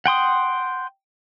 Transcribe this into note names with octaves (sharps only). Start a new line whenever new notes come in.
F#5 G5 C6 D#6